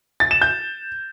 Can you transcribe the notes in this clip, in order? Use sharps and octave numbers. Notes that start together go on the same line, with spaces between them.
A6
E7
G6